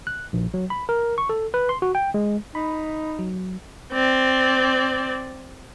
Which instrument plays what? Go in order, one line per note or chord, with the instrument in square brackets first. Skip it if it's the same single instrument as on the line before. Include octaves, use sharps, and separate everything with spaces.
[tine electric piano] F#6
A#1
F#3
B5
A#4
C#6
A4
B4
C6
F#4
G5
G#3
[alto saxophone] D#4 [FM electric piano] B5
[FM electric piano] F#3
[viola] C4 D5